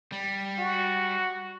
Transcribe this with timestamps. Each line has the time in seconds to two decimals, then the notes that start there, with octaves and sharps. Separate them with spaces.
0.12 G3
0.59 F#4